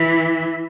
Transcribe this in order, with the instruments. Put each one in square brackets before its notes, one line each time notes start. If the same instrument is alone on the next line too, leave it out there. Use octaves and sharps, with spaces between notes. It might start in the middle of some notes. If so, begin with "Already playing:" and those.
Already playing: [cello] E3